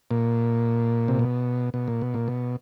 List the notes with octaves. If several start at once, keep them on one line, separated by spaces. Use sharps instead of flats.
A#2
C3
B2
B2
A#2
B2
A#2
B2